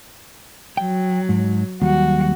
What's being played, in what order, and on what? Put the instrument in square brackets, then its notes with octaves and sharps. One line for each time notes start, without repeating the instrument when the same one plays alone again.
[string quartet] F#3 [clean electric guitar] G5
[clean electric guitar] G#2
[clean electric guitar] D#2 [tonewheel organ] F#3 G3 [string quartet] F#4